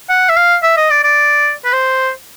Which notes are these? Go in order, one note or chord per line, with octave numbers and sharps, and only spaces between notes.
F#5
E5
F5
E5
D#5
D5
D5
B4
C5